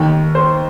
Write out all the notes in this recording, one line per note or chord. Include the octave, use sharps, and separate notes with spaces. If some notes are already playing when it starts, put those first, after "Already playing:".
Already playing: D#2 D#3
C5